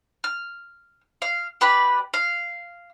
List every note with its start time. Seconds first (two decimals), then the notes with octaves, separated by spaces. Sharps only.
0.24 F6
1.22 F5
1.61 G4 B4 D5 B5
2.14 F5